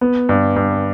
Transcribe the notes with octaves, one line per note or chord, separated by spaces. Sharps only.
B3
G2
G2